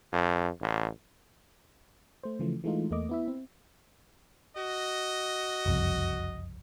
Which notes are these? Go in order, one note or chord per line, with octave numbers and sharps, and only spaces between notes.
F2
A1
A3 C5
C#3 E3 F3 A3
E3 G#3 A3 D#4 F4
E2 A3 A#3 D#5 D6
B3 E4 E5
C4
F#4 D#5
F#1 C2 F2